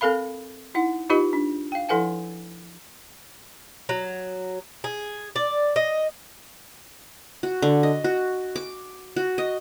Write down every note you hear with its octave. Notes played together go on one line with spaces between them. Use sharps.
C4 A4 A#4 F5 B5
D#4 E4 F#5
D#4 F4 G4 B4 D#5 B5
D4
F5 G5
F3 E4 A4 B4 F#5 G#5
F#3
G#4
D5
D#5
F#4
D3
D#5
F#4
D6
F#4
D#5